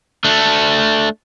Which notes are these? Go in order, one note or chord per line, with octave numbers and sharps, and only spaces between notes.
A3 D4